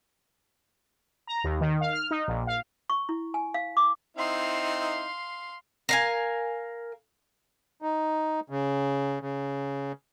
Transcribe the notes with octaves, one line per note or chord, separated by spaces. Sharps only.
A#5
D#2
D#3
F5
F6
D#4
A#1
F5
C#6
E4
G#5
F5
D6
C4 D#4 E4 F5 C6
A#4 F5 G#5
D#4
C#3
C#3